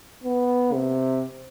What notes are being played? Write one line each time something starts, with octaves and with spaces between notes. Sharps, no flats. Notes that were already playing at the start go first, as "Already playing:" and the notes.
B3
C3